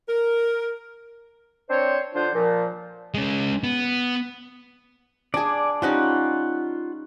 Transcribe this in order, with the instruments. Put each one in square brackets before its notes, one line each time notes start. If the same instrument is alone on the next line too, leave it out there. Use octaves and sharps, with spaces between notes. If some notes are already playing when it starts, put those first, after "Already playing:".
[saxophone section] A#4
[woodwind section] C4 D4 C5 C#5
D3 F3 D4 F4 C5
A#2 F3
[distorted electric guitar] G#3 C#4
B3
[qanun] D4 G#4 [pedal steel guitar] D5 G#5
[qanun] G3 C#4 D#4 [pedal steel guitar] F4 F#5